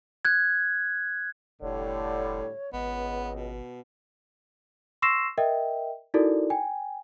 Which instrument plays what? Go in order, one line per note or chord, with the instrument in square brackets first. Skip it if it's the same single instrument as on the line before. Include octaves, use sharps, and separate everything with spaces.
[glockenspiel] F#6 G#6
[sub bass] F1 [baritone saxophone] A2 [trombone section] D3 G3 [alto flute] C#5
[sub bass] G#1 [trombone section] C#2 [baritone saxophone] B3 [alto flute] D#5
[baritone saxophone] B2
[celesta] C6 C#6 E6 A#6 C7 E7
A#4 D#5 E5 G5
D#4 E4 F#4 A4 A#4 D5
G5 G#5